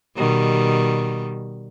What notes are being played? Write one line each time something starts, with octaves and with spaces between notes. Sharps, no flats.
B2 D#3 G3